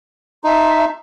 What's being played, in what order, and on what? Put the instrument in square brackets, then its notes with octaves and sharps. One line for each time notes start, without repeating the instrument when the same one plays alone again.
[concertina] D#4 [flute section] E5 A5 C6